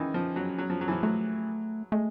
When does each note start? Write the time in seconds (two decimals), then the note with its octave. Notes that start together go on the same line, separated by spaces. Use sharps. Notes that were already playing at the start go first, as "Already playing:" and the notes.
Already playing: D#3 E3 C#4
0.14 F3
0.36 F#3
0.58 F#3
0.70 F3
0.81 F#3
0.88 E3
0.91 F3
1.03 F#3 A3
1.92 G#3 A3